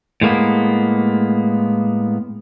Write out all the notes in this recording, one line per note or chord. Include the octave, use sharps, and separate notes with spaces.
A2 G#3 A#3 B3